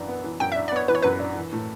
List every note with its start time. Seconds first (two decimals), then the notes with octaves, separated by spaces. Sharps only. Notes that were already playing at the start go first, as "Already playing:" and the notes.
Already playing: F#2 E3 D4
0.08 B3
0.24 E3
0.40 F#2 G5
0.52 E5
0.56 D4
0.68 D5
0.72 B3 C#5
0.88 E3 B4
0.95 C#5
1.02 F#2 B4
1.20 D4
1.35 E3
1.53 A2